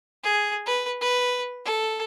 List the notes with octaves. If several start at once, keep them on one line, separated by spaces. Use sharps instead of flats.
G#4
B4
B4
A4